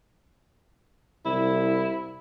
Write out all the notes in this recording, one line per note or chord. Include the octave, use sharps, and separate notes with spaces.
C2 E4